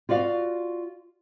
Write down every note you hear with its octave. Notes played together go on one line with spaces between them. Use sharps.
F4 F#4 D5 F5